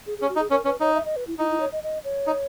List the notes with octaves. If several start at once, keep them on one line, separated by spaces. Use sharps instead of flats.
G#4
G#4
C#4
F#4
D#4
G#4
C#4 A#4
C#4 B4
D#4 C#5
E5
D#5
B4
E4
D#4 E4
E4
C#5
D#5
D#5
C#5
D#4